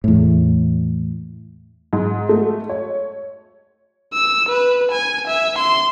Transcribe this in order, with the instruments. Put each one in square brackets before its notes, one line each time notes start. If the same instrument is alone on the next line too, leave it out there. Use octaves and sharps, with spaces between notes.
[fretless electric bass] E2 A2
[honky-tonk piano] G#2
A3
C#5
[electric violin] E6
B4
G#5
E5
C6